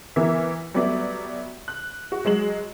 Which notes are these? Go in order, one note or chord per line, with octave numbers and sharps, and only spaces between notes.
E3 B3 A#4 E5
F#3 G3 A3 B3 D5 E5
F#6
F#4
F#3 G#3 E7 F#7